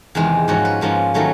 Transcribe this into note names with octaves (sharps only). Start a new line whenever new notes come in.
E2 C3 D#3 G#3
G#2 F3 A#3 C#4 F#4
B4
G#2 F3 A#3 C#4
D#3 F#3 A3 C#4